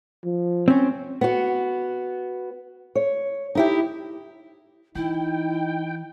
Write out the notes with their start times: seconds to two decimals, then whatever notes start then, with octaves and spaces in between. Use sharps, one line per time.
0.24 F3
0.68 C4 C#4
1.21 B3 F#4
2.95 C#5
3.55 D#4 E4 G4
4.95 E3 D#4 E4 G5